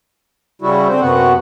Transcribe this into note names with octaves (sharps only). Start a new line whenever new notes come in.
C#3 G3 E4 F#4
D3 C4 C5
F#2 C3 B3 F#4 F#5